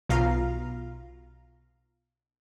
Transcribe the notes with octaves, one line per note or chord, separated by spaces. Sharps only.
B1 B2 F4 F5 A#5